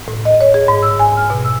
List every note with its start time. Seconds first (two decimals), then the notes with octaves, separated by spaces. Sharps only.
0.08 A2
0.25 D#5
0.41 C#5
0.54 G#4
0.68 G#2
0.82 E6
0.99 G#5
1.17 F6
1.30 B2
1.45 E6